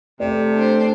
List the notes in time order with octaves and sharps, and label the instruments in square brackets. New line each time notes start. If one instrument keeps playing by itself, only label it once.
[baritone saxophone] C3 [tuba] A3 [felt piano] D5
[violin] D4 C5